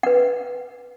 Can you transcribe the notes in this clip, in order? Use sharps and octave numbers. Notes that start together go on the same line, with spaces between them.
B4 F#5